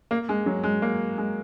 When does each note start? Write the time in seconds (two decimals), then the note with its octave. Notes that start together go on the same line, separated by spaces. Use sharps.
0.11 A#3
0.29 G#3
0.46 F#3
0.64 G#3
0.82 A#3
1.18 G#3